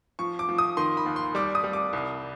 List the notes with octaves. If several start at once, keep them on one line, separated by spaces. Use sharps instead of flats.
F3 C#6
D6
F3
D#6
D#3 C6
B5
D#2
C6
G3 D6
D#6
G3
D6
C2